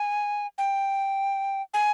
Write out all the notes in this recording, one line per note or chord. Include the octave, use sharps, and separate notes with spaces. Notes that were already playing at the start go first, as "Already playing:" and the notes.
Already playing: G#5
G5
G#5